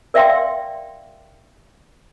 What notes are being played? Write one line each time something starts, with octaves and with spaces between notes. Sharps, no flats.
A#4 D5 E5 F5 G5 C6